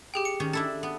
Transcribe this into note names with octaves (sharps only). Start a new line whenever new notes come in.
G4 G#4 G5
C#7
D#3 C#4
D4 E4 A4 A5
B3